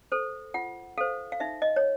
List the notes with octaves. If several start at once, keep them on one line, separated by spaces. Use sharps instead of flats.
A4 C5
F4 F#5
A4 C5 F5
F5
D#4 E5
D#5
C#5